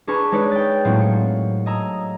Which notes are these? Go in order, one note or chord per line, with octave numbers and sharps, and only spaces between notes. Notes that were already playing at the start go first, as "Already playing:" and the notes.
D4 G#4 A#4 B4 G#5 C#6
G#3 D#4 B4 C#5 D5
G5 A6
A2 F#3 A#3 C4
C#7
D#5 G#5 A#5 E6